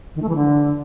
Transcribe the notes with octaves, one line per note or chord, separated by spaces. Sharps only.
D#3
A3
E3
D3